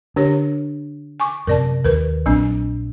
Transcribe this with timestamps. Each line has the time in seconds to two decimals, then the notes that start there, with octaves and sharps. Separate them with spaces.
0.16 D3 D4 G4 C#5
1.20 G#5 C#6 D6
1.47 F#2 C3 A#4 D5 A5
1.85 D#2 A#4 B4
2.26 A#1 F#3 C4 D4